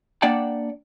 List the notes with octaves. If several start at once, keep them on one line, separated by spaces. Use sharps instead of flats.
A#3 D4 D5 F#5 G5 A5